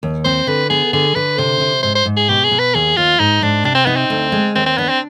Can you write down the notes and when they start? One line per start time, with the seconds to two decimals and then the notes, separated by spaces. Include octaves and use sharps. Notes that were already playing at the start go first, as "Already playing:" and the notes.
0.03 D#2
0.25 C4 C5
0.47 D3 B4
0.70 B3 G#4
0.93 D3 G#4
1.15 D3 B4
1.38 C3 C5
1.60 C3
1.83 G#2 C5
1.95 C5
2.06 G#2
2.17 G#4
2.29 B2 G4
2.44 G#4
2.51 B2
2.59 B4
2.74 D#2 G#4
2.97 D#2 F4
3.19 G#2 D#4
3.42 G#2 D4
3.64 C3 D4
3.75 C4
3.86 B3 D#4
3.96 C4
4.10 D2
4.32 G#3
4.55 D#2 C4
4.66 C4
4.78 B3 D4
4.89 C4